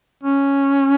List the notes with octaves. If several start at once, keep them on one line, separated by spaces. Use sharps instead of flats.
C#4